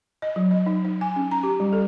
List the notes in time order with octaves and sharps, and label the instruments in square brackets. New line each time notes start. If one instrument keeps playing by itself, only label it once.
[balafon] D#5
F#3
D#5
D#4
D#4
G#5
C#4
A#5
G4
G3
A4